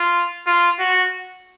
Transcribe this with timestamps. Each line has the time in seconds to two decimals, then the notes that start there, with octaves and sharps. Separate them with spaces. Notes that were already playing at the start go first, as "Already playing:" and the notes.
Already playing: F4
0.47 F4
0.80 F#4